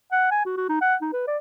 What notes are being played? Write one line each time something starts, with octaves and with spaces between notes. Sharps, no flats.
F#5
G#5
F#4
F#4
D#4
F#5
D#4
B4
D5